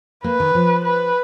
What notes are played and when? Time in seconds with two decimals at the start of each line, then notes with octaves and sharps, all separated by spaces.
0.24 A#3 B4
0.40 D#3
0.55 F3
0.85 B4